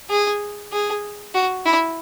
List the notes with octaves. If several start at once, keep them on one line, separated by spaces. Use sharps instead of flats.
G#4
G#4
F#4
E4